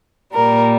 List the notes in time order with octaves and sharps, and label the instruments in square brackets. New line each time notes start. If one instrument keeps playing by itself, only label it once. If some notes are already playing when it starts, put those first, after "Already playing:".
[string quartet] A#2 G3 A#4